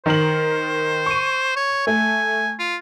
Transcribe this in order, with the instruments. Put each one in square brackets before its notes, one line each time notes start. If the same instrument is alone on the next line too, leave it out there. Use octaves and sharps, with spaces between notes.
[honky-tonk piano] D#3 A#4 F#7 [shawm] C5
[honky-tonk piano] C#6 D#7
[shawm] C#5
[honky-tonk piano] A3 [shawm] G#5
[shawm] F4